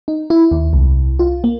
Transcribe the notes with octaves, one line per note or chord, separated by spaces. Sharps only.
D#4
E4
D#2
C2
F4
A#3